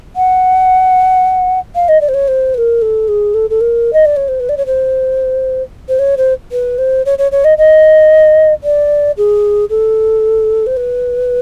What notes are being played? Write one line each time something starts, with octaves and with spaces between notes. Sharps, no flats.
F#5
F5
D#5
D5
C5
C#5
C5
B4
A#4
A4
G#4
A4
A4
A#4
D#5
D5
C#5
C5
B4
D5
C#5
C5
C5
C#5
C5
B4
C5
C#5
C#5
C#5
D#5
D#5
D5
G#4
A4
C5
B4